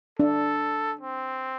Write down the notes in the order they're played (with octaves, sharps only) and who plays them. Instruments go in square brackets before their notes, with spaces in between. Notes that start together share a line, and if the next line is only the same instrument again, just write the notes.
[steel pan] D4 [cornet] A4
[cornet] C4